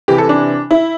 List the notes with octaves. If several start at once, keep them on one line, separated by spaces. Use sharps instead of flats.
C3 E3 G4
A4
D4
E4